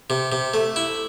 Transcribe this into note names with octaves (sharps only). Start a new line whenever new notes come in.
C3
C3
A3
E4